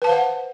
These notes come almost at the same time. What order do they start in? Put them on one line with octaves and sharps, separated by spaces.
B4 A5 F5 C5 F#5